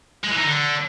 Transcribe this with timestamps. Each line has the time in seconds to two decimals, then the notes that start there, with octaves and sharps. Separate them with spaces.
0.24 G#3
0.31 E3
0.37 D#4
0.44 D3